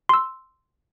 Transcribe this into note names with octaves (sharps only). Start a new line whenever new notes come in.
C6 E6